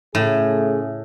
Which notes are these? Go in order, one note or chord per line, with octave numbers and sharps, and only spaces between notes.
A2 C#3 A3 G#4